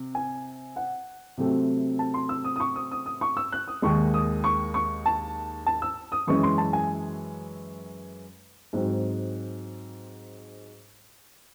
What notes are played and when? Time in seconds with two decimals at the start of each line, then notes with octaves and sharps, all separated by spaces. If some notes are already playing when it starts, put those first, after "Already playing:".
Already playing: C3
0.15 G#5
0.76 F#5
1.38 C3 F#3 A3 C4
1.99 A5
2.14 C6
2.29 E6
2.44 D#6
2.56 D#6
2.60 C#6
2.76 D#6
2.91 D#6
3.06 D#6
3.21 C#6
3.37 E6
3.52 F#6
3.68 D#6
3.82 D#2 D#3 G#3 C#6
4.14 D#6
4.44 C#6
4.74 C#6
5.06 A5
5.66 A5
5.82 E6
6.12 D#6
6.27 F#2 E3 G#3 C#4 C#6
6.43 C6
6.58 A5
6.73 G#5
8.73 G#2 F#3 C4